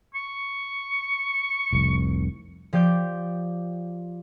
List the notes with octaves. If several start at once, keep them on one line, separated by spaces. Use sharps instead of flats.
C#6
F1 C2
F3 G4 D5 G6